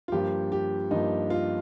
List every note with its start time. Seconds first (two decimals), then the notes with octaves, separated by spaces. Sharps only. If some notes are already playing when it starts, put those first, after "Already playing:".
0.08 F4
0.12 G2 F3 A#3 G4
0.52 G4
0.91 G2 F3 A#3 D#4
1.30 F4